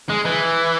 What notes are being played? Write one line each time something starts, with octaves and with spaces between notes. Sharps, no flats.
G#3
E3